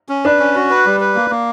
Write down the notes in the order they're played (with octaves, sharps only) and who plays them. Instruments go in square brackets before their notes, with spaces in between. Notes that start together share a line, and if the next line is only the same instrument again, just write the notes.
[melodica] C#4
[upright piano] D4 [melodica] B4
[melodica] C#4
F#4
B4
G3
B4
A#3
A#3